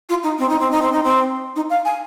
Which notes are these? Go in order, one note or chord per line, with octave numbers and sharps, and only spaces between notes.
F4
D#4
C4
D#4
C4
D#4
C4
D#4
C4
D#4
F5
G#5